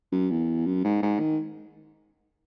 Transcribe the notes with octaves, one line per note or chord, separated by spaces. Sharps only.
F#2
E2
F#2
G#2
G#2
D#3